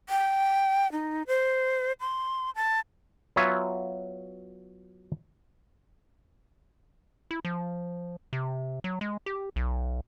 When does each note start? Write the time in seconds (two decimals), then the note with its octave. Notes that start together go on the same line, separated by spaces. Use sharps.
0.09 G5
0.92 D#4
1.27 C5
2.00 C6
2.56 A5
3.36 F#3 B3 F4 C#5 E5 G#5
7.31 E4
7.45 F3
8.33 C3
8.84 F#3
9.01 G#3
9.26 G4
9.56 B1